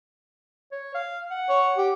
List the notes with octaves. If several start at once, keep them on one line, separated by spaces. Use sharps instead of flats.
C#5
F5
F#5
C#5
G4